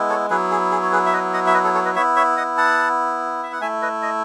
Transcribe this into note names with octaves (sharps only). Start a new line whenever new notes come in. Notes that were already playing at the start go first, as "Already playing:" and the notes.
Already playing: G#3 B3 E4
A4 C#5
F#3 B3 E4 G#4 B4
G#4
G#4
C#5
G#4 B4
E5
B4 D#5
D#5 F#5
E5
B4 D#5
A4 C#5
A4 C#5
B4 D#5
B3 E4 C#5 E5
C#5 E5
D#5 F#5
F#5 A5
E5
F#5
A3 E4 E5 G#5
B4 D#5
D#5